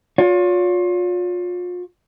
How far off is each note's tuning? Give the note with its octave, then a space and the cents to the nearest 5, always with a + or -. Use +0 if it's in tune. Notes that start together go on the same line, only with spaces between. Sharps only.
F4 +35 C#5 +40